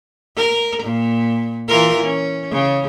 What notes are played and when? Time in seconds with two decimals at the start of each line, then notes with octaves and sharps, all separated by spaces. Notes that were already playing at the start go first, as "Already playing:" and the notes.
0.36 A#4
0.83 A#2
1.68 E3 F4 A#4
2.03 C#4
2.51 C#3